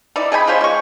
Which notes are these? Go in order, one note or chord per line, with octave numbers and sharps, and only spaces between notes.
D#4 E4 D5
G#4 D#5 G#5 B5
G#3 F4 C5 C#5
G#3 C#6